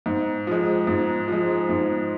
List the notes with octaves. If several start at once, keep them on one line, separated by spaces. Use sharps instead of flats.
G#2
F3 G#3
G#2
F3 G#3
G#2